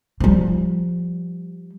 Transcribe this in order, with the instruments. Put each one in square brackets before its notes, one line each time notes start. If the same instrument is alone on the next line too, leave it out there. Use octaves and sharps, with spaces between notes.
[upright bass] F3 G3